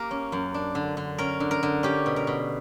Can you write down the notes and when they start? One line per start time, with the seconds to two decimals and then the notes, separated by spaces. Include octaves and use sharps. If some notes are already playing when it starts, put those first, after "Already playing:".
Already playing: A#3 G4 A#4
0.11 C#4
0.32 F#2
0.54 D4
0.75 D3
0.97 D3
1.18 C#4 A#4
1.40 D3
1.51 A#4
1.63 D3
1.83 C#4 G4
2.06 B2
2.16 A#4
2.27 B2